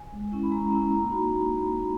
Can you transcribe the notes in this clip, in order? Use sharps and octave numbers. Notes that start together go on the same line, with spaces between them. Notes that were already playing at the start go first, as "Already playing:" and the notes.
Already playing: G#5
G#3
C#4 E4
B5
G#3 A#5
C#4 E4
A#3 A#5
D#4 F#4 B5